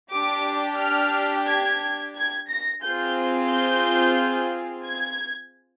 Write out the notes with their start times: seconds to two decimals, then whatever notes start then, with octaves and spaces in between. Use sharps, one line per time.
0.12 D4 G4 D6
0.79 F6
1.47 G#6
2.15 G#6
2.48 A#6
2.82 C4 F4 G#4 G6
3.49 G6
4.84 G#6